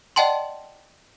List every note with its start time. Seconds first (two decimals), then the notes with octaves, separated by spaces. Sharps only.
0.16 D5 D#5 F#5 G5 A5 C6